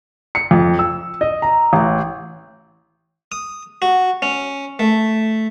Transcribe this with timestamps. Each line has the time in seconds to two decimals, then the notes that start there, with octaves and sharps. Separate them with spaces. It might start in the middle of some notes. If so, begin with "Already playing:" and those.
0.35 C#7
0.51 F2
0.79 E6
1.21 D#5
1.42 A#5
1.73 A1
3.32 D#6
3.82 F#4
4.22 C#4
4.79 A3